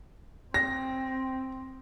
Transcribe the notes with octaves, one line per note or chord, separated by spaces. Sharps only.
C4 A#6